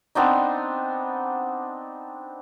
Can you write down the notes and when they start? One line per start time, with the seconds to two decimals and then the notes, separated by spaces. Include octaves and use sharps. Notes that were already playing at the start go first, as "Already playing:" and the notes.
0.15 B3 C4 D4 D#4